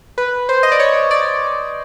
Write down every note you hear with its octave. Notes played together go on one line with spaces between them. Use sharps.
B4
C5
D#5
D5
C#5
D5